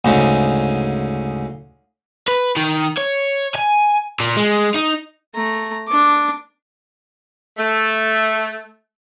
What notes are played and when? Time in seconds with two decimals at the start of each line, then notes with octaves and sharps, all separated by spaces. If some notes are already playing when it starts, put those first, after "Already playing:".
0.05 D2 G#2 C#3
2.28 B4
2.57 D#3
2.97 C#5
3.55 G#5
4.20 A#2
4.36 G#3
4.74 D#4
5.34 A3 A#5
5.88 D4 D6
7.58 A3